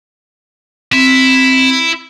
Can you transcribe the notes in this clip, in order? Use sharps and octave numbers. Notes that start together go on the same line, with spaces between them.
C4 E4